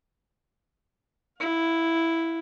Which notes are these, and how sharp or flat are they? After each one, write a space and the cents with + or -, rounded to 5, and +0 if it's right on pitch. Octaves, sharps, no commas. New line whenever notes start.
E4 +0 F5 +30